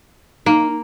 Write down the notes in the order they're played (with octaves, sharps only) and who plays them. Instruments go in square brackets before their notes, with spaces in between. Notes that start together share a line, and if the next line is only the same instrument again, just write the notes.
[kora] A#3 [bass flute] D#4